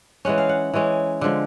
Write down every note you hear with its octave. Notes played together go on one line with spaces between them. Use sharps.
E3 G#3 C#4 F#5
F5
F#5
E3 G#3 C#4
D3 F3 G#3